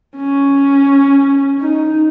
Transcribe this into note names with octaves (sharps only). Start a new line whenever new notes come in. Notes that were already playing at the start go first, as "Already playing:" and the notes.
C#4
D#4